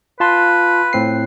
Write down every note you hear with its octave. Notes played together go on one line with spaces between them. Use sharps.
F4 B4 A5 C6
A2 C4 C7